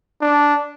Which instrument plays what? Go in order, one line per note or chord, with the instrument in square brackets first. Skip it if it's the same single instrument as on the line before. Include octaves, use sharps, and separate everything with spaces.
[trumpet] D4